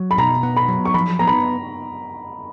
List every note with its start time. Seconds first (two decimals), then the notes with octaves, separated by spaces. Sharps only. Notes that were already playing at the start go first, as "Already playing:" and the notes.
Already playing: F#3
0.11 B5
0.18 B2 A#5
0.43 B3
0.56 B5
0.68 F#3
0.85 C#6
0.94 F3 B5
1.19 B3 A#5
1.27 B5